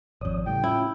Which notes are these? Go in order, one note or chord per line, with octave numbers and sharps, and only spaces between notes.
G#1 F2 C#5 D5 D#6
A2 C#3 G3 G5
C#4 E4 F4